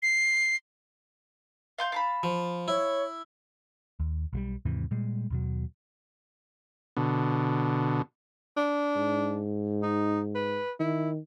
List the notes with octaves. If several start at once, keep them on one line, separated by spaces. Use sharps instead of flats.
C7
F5 C6 G6
F5 A5 B5
F3
E4 C#5
D#2
B1 F#3 G3
D#2 G#2 C3 E3
A#2 G3 G#3
D#2 B2 F#3
B2 D3
D4
G#2
D#4
B4
D#3 E4